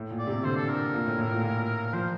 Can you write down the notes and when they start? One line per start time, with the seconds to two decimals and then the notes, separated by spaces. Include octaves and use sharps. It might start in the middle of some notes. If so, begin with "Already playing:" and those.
Already playing: A2
0.11 A#2
0.19 D5
0.27 C3
0.43 D3 C5
0.57 A4
0.69 A#4
0.93 A#2
1.06 A2
1.18 A2
1.31 A#2
1.43 A#2
1.87 A#4
1.93 F3 C5